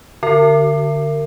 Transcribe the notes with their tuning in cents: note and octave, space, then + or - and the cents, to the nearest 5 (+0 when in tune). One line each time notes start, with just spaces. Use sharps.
D3 +0 A#4 -20